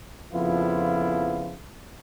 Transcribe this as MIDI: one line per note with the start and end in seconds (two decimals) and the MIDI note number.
0.33 1.57 41
0.33 1.57 49
0.33 1.57 53
0.33 1.57 59
0.33 1.57 64
0.33 1.57 65